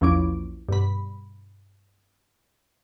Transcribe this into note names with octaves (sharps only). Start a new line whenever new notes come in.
A#1 E2 F3 C#4 D6 D7
G2 B2 B5